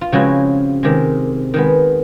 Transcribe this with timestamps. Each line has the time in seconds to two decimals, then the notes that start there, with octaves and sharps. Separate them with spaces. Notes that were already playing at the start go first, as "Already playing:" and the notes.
0.01 F4
0.12 C#3 F3 G#3 C4 E4 F#4
0.83 C3 D#3 G#3
1.54 D#3 G#3 B3